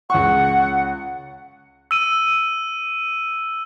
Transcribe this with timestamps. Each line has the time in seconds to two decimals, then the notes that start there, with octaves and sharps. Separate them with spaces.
0.10 C#2 F#5 C#6
1.91 E6 D#7